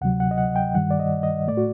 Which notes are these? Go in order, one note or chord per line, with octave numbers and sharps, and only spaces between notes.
D2 C3 F#3 F#5
F#5
D#5
F#5
G5
G2 D#3 G3 F#5
D5
D#5
D#5
A2 A3 D5
F#4